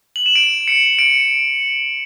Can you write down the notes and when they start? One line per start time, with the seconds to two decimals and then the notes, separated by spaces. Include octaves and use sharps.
0.16 F#7
0.26 E7
0.36 D7
0.68 C#7
0.99 D7